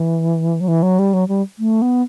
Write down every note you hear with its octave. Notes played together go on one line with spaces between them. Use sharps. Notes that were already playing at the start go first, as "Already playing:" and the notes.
Already playing: E3
F#3
E3
F#3
G3
F#3
G3
A3
B3